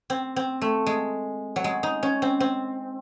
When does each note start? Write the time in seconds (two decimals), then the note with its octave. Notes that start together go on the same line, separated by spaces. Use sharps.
0.10 C4
0.36 C4
0.62 A3
0.87 G#3
1.56 F#3
1.64 G#3
1.83 D#4
2.03 C#4
2.22 C4
2.40 C4